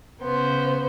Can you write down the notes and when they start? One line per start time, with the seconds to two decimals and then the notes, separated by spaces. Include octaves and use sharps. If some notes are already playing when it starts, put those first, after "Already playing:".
0.22 C#3 B3 C5